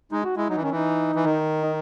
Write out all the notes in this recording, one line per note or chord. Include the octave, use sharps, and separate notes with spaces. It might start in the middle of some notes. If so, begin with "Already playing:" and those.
G#3 D#4
F#4
G#3 E4
F#3 D#4
E3
D#3 C#4
E3 D#4
E3
D#3
D#4